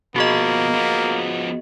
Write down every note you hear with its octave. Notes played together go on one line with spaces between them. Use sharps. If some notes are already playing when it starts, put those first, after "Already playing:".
B2 F3 A#3 F#4 G#4 D#5
F3 B3